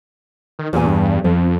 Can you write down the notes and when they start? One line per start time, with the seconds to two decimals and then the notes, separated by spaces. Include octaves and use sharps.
0.59 D#3
0.73 E2 A#2 G#5
0.86 G2
1.24 F2 F3